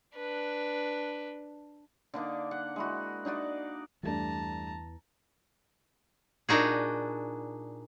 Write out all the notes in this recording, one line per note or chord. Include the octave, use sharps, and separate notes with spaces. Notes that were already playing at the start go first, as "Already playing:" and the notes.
D4 B4
D3 A#3 D4 D#4
F#5
G#3 E4 F#4
D4 D#4 F#4 D5
E2 G2 E3 A3 D4 A5 A#5
A#2 D4 D#4 F#4 G#4